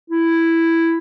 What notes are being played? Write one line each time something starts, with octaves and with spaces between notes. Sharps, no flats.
E4